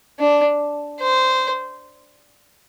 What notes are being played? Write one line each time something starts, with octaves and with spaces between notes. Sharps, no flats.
D4
C5